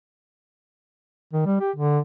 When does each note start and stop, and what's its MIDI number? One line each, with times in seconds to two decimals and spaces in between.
1.34 1.45 51
1.46 1.57 55
1.60 1.71 67
1.76 1.99 50